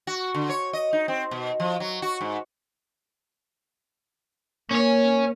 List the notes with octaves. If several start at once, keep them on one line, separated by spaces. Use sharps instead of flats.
F#4
D3
C#5
D#5
D#4
C4
B2
F3
F#3
F#4
G#2
A#3 C#4 C#5